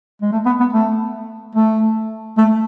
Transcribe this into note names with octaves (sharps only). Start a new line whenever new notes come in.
G#3
A3
B3
B3
A3
A3
A3